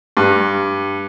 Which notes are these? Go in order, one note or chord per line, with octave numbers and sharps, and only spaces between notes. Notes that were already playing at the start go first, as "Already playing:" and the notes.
G2